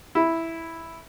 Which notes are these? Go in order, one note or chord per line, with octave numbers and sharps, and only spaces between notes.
E4